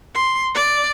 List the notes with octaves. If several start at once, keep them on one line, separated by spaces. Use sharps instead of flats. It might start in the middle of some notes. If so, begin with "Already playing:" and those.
C6
D5